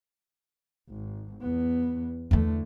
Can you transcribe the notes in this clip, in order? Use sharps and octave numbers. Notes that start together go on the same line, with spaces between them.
G#1
E2 B3
E2 D3 E3 A3